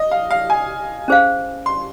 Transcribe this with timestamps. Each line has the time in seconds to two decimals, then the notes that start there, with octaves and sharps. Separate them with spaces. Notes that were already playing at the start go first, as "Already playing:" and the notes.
Already playing: D#5
0.11 F5
0.31 F5
0.50 G#5
1.08 C#4 G#4 C5 F5
1.66 C6